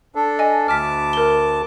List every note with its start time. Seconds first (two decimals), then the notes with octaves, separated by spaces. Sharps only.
0.15 D4 A4
0.39 D#5 G#5
0.68 D2 A5 D6 F6 B6
1.13 A#4 G7